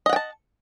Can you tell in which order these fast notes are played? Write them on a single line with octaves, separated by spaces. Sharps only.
D#5 F#5 G5 A5